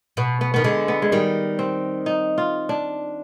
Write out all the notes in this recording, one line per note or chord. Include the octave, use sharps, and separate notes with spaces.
B2 B3
B3
D#3 B3
D3 G#3
B3
G#3
D#3 G3
C4
D#4
F4
D4